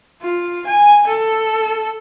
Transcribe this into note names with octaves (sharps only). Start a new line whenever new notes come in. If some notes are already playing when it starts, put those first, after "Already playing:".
F4
G#5
A4